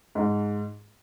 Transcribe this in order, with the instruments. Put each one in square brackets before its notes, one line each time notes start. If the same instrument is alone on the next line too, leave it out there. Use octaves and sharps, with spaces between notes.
[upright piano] G#2